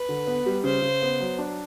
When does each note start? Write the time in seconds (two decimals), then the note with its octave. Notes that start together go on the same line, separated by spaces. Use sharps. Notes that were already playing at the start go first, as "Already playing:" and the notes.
Already playing: B4
0.09 D3
0.27 B3
0.46 G3
0.64 C#3 C5
0.82 C#3
1.02 B3
1.20 F#3
1.38 D4